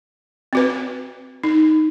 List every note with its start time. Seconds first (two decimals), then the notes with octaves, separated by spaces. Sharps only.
0.53 C4 F#4 B4
1.44 D#4